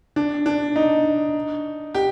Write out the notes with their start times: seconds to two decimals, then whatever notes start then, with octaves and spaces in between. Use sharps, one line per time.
0.16 D4
0.46 D4
0.76 D#4
1.94 G4